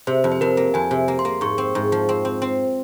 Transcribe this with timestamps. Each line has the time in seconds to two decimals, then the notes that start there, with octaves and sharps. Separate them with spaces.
0.07 C3 C5
0.24 F2
0.32 C5
0.41 F2 A#4
0.57 A#3
0.74 F2 G#5
0.91 C3
1.08 A#3
1.19 C6
1.25 A#3
1.41 G#2 C#6
1.58 C4
1.75 G#2
1.92 F3
2.09 C4
2.25 C4
2.42 C4